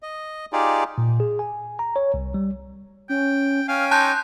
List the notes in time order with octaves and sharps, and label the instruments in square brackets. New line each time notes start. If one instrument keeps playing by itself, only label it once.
[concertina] D#5
D#4 F4 G4 G#4 D5
[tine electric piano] A#2
G#4
G#5
A#5
C#5
C2
G3
[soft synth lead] C#4 [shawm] G5
[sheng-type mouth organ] C#4 G5 G#5 [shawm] F5
[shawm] D#4 [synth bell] A5 F#6 G6 [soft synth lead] C6